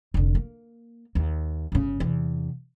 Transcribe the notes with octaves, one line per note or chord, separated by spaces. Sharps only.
F1 D3
A#3
D#2
G1 C#3
E2 C3